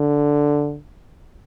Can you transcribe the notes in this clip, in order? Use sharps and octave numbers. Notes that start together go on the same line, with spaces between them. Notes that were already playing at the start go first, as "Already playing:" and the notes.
Already playing: D3